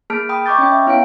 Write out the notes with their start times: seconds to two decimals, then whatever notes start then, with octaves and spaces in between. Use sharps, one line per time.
0.10 A#3 G#4 A5 F6 B6 D7
0.29 G5 B5 D#6
0.46 D#5 B5 C#6 D6 G6 A6
0.58 C#4 G5
0.72 E5
0.87 B3 E4 C#5 F5 G5 D7